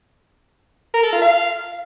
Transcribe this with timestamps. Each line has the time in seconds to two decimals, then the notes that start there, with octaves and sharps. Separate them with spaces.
0.94 A#4
1.03 A4
1.13 F4
1.22 F5